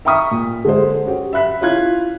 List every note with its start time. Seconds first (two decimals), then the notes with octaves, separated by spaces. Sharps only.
0.05 E5 G5 A#5 C#6 D#6 B6
0.31 A#2
0.65 D3 G#3 C5
1.05 C#4 F#4 G4
1.33 E5 B5 F#6 B6
1.61 C#4 E4 F4 F#6 G#6